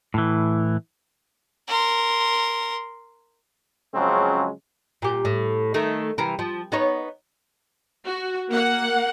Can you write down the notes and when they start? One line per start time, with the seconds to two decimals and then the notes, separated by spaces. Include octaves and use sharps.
0.14 A2 E3
1.68 A#4 C6
3.95 C#3 F3 F#3 G#3 C4 C#4
5.02 A#2 G4
5.25 A2
5.74 D#3 A3
6.18 C3 E3 A#4
6.39 F3
6.72 B3 D#4 C#5
8.05 F#4
8.50 A#3 F#5